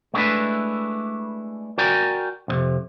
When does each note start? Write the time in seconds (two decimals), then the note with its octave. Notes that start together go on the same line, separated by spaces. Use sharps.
0.14 G#3 A3 B3 D4 E4 B4
1.78 F#4 A#4 D5 G5 G#5 A#5
2.48 C2 F2 C3